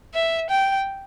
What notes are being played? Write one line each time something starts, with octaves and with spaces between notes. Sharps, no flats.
E5
G5